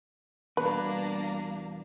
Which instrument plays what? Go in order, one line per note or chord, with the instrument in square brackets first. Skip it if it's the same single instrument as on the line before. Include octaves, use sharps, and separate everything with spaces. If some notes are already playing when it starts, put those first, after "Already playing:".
[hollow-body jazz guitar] E2 B2 [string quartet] G3 A#3 D4 [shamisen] B4